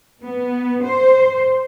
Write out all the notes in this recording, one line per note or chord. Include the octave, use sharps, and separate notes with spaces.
B3
C5